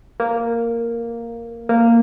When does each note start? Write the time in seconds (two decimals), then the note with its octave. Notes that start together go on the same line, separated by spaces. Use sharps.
0.20 A#3
1.69 A#3